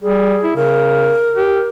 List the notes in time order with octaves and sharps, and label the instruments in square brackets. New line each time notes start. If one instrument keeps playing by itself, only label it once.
[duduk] G3 [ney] G#4
[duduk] E4
[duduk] C#3 [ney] A#4
[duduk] G4